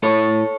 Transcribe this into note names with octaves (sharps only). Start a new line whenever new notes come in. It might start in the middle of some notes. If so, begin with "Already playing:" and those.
A2 A4 C#5